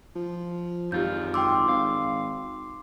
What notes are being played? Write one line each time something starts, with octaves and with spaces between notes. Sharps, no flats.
F3
G#1 F#2 F4 G4 G6
G5 C6 D6 E6
G#1 F5